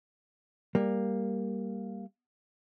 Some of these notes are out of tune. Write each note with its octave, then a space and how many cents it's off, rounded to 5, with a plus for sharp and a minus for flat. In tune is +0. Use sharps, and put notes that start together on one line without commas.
G3 +10 A#3 +0